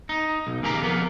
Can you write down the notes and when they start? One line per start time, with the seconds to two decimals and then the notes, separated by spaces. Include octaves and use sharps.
0.09 D#4
0.47 B1
0.62 D#2 C#3 A#3 G4 A#5
0.83 F2 A#3 B3